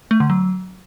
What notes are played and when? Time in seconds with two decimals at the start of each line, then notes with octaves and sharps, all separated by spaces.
0.11 A3
0.20 D3
0.30 F#3